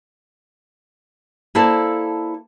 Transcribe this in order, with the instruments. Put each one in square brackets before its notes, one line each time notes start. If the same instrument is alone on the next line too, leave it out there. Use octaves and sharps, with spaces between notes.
[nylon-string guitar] A#3 E4 A4 C5 D5 A5